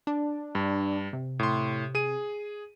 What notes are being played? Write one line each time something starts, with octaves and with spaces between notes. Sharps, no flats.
D4
G2
C3
A2 C6
G#4 D#7